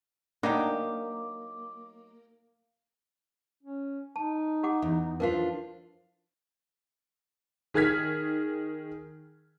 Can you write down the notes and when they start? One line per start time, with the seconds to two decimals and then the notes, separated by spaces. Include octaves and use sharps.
0.43 F#3 A#3 D4 D#4 G4 D6
3.63 C#4
4.16 D#4 A5
4.63 G4 F#5 D6
4.82 E2
5.20 F3 D4 F4 A#4 B4 F5
7.74 D#3 G#4 F6 G#6 B6